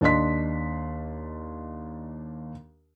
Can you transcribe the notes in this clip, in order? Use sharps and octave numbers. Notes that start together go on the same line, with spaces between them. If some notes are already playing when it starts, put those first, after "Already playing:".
D#2 D4 D#5 C6 B6